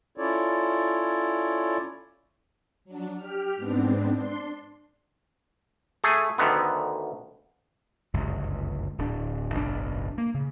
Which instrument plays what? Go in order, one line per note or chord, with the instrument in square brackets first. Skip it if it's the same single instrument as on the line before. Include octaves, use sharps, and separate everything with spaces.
[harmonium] C#4 E4 F4 A4 C#5 D5
[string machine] F#3 D4
G4 F6
G#2 B3 C4 D4
D4 C6
[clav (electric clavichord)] A3 G#4 G#5
D2 D3 D#3 B3
[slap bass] G1 C#2 F#2
D1 D4
F#1 B1 G#2 D4
A#3
C#3